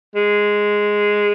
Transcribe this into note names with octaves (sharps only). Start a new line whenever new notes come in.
G#3